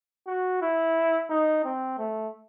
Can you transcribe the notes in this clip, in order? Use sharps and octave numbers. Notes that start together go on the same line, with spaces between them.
F#4
E4
D#4
C4
A3